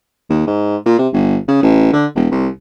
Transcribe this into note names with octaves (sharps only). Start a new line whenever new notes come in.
D#2
G#2
A#2
C3
G1
C#3
A1
D3
E1
C2